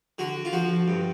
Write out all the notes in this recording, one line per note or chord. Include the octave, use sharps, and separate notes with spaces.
D3 F#4
F4
F3 F#4
G2